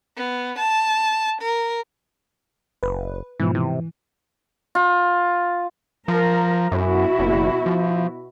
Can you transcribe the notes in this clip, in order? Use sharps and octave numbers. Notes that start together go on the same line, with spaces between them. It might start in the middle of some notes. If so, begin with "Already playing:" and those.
B3
A5
A#4
F#1 B4
G#2 B2 E3 F3
C3 E3
F4
F3 A#4
F#2 B2 E4 F#4
F#1
F3